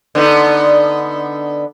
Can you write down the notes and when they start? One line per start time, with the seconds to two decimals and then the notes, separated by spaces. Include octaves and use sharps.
0.15 D3 B3 D#4